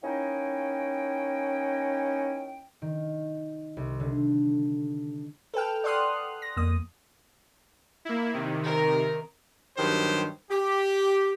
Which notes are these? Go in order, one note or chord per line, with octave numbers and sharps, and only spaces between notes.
A#3 C#4 D#4 E4 D#5 G5
D#3
C2
D3
A4 B4 G5 F6
D5 F#5 C6 D#6 F6 F#6
A#6
F2 A#3 D#6
A#3 E4
C3 D#3
A#4
G2 D#3 F#3 G4 C5
G4